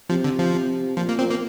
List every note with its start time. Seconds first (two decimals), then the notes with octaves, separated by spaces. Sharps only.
0.10 C3 F3
0.24 D3
0.39 F3
0.54 C3
0.97 A#2 F3
1.09 A#3
1.19 A#2 C4
1.30 A#3